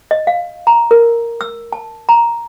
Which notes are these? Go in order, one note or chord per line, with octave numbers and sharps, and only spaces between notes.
D#5
F5
A#5
A#4
E6
A5
A#5